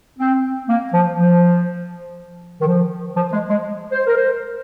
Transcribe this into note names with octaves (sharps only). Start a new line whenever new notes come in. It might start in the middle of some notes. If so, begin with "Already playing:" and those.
C4
A#3
F3
F3
D#3
F3
F3
G#3
G#3
C5
A#4
C5